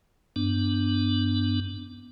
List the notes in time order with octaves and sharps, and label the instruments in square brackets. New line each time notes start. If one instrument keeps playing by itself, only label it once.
[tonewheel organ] G2 B3 D4